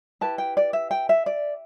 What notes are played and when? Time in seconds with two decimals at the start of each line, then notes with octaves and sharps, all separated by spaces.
0.21 E4 G4 B4 A5
0.38 G5
0.57 D5
0.73 E5
0.91 G5
1.09 E5
1.26 D5